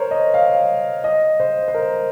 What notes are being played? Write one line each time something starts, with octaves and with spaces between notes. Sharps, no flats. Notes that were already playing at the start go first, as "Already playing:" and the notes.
Already playing: A#4 C5 C#5
D#5
F5
D#5
C5
C5
A#4